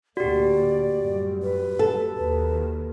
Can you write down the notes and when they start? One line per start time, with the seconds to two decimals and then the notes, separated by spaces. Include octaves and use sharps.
0.17 D2 A2 A#3 F#4 G4 D5
0.97 F#2 A2 G3
1.42 B4
1.79 A4
2.17 D#2 D#3 B4